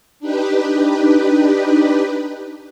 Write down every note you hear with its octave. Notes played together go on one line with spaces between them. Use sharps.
D4 D#4 G4 B4